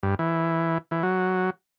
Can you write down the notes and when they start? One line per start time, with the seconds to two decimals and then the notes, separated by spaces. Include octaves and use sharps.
0.03 G2
0.19 E3
0.91 E3
1.03 F#3